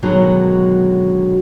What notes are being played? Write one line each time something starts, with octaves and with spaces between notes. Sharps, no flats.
F#2 B2 D3 D#3 F#3 G#3